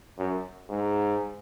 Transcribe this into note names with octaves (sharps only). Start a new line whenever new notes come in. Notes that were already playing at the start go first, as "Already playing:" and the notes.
F#2
G#2